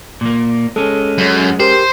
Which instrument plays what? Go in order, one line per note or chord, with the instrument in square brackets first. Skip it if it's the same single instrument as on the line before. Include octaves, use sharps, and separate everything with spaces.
[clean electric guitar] A#2 A#3
[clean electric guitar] G#3 C#4 [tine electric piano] A4
[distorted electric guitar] F#2
[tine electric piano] G4 A#4 [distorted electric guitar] C5